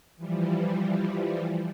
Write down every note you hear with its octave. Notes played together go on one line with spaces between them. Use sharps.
E3 F3 G3